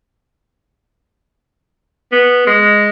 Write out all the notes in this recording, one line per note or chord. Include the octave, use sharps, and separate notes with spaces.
B3
G#3